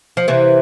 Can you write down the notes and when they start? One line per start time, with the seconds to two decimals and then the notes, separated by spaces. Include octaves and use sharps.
0.17 F3
0.28 C3 E3